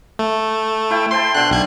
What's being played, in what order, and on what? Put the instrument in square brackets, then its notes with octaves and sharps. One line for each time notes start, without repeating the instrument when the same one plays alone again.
[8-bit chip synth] A3
[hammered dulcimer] E4 G5
[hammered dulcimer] C5 G5 A5 [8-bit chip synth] C6
[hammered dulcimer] B2 D3 [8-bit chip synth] C6 F#6
[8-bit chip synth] B1 F#6 G#6